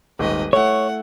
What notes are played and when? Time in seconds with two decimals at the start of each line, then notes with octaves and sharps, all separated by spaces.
0.19 D#1 G#1 D#3 B4 D#5
0.53 A3 E4 C#5 F#5